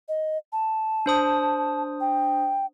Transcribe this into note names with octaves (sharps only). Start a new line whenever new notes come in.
D#5
A5
D4 C5 D#6
G5